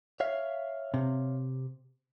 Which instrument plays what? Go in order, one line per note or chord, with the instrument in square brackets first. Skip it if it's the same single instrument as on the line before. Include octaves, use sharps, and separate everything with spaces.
[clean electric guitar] C#5 E5 F5
[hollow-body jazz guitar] C3